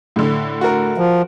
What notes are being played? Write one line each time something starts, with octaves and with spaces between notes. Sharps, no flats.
A2 D3
F#4 A#4
F3